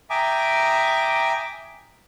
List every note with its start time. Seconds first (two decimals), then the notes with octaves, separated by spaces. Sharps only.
0.10 E5 G5 G#5 A#5 D6 D#6